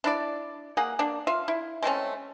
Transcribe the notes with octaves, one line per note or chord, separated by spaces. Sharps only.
D4 E4 D5
A#3 G#4 F#5
A#3 D4
F4 E5 F5
E4
G#3 A3 C4 C#4